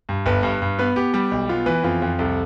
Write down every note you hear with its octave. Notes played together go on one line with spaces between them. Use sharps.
G2
G1 B4
G2
G2
B3 B4
B3 G4
G3 G4
B1
B3 F4
E3 B4
F2 F4
F2
C2 A4